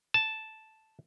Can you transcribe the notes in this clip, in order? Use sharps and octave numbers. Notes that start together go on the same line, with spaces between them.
A5